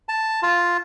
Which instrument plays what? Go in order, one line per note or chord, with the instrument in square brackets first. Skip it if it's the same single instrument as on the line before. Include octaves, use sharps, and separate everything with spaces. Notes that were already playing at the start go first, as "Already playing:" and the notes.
[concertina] A5
F4